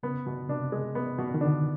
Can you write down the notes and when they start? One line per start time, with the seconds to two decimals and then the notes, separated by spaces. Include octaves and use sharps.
0.03 C#3 B3
0.26 B2
0.49 C3 D4
0.72 G#3
0.95 B3
1.18 B2
1.34 D#3
1.41 D3 D4